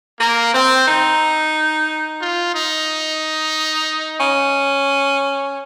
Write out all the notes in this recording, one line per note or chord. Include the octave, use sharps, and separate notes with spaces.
A#3
C4
D#4
F4
D#4
C#4